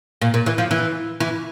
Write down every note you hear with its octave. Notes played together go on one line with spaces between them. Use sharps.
A#2
A#2
E3
F3
E3
E3